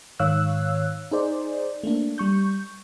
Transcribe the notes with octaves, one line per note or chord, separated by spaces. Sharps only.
G#2 D#3 C#5 F5 E6 F#6
D#4 G#4 C5 D5
A3 A#3 D4
G3 C#6 G6